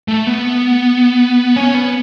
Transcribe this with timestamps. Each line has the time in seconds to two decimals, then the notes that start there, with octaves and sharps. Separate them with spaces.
0.08 A3
0.27 B3
1.56 C#4
1.74 B3